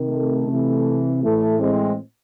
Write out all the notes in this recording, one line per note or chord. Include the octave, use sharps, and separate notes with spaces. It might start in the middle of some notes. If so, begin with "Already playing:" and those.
Already playing: C3 D#3
A3
C3 E3
A2 E3 A3
G#3 C4